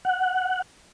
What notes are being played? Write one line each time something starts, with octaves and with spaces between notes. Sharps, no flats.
F#5